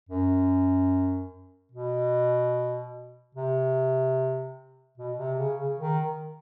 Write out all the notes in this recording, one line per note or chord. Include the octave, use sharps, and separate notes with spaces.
F#2
B2
C3
B2
C3
C#3
C#3
D#3